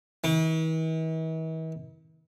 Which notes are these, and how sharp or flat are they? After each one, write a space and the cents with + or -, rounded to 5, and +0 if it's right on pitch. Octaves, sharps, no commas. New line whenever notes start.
E3 -45